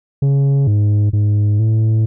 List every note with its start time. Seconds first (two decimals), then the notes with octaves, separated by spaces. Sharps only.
0.22 C#3
0.67 G#2
1.13 G#2
1.59 A2